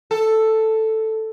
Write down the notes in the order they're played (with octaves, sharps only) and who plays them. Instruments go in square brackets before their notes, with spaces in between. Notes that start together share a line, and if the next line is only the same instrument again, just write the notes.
[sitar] A4